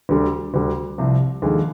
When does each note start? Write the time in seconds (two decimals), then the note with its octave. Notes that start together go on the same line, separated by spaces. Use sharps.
0.09 D2 D3 G3
0.54 D2 D3 G3
0.98 C2 C3 F3
1.42 D#2 D3 F3 G#3